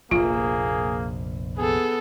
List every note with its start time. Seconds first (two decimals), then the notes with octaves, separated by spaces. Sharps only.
0.11 F1 A#1 A#3 F4 G#4
1.57 B3 G#4 A4